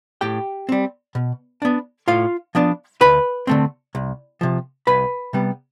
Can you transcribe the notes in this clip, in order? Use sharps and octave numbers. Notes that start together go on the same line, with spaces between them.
A2 G4 G5
G3 C4
B2
B3 D4
A2 F4 F5
F3 B3 D4
D2 B4 B5
D3 A3 C4
C2
C3 F3
C2 B4 B5
C3 G3 B3